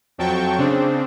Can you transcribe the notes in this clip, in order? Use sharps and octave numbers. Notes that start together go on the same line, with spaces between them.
F2 F#3 G5 A5 C#6
C#3 C4 D4